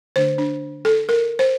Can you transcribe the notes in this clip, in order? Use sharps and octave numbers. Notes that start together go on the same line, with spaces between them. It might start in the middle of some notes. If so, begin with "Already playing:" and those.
D3 A3 D4 C5
D4
A4
A#4
C5